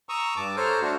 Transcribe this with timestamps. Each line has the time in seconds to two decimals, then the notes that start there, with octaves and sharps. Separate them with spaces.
0.09 A#5 C#6 D#6 E6
0.36 G2 A5 D6
0.56 A4 C5 C#5 A#5 F6
0.82 A3 D4 F#4